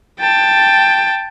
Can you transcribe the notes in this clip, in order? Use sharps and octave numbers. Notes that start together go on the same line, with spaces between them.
G5 A5